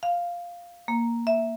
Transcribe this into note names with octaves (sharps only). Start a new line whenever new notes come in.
F5
A#3
E5